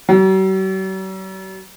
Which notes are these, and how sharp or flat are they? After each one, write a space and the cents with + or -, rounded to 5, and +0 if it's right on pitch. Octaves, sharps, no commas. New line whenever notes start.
F#3 +45